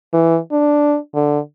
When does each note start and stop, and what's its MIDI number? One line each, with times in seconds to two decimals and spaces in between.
0.13 0.38 52
0.52 0.97 62
1.15 1.39 50